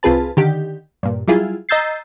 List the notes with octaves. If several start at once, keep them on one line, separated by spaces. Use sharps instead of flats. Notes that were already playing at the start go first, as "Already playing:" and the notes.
C2 C4 F4 G#4 B4 A5
D3 D#3 G4
G2 A#2
F#3 G3 E4 F4 G#4
D#5 A#5 E6 G6 A6 C7